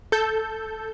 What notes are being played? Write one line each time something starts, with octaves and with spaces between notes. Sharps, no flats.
A4 G6